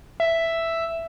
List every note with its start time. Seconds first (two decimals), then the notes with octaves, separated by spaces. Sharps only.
0.20 E5